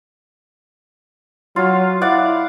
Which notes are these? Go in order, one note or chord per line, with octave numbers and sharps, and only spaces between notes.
F#3 F4
E4 D5 F5 F#5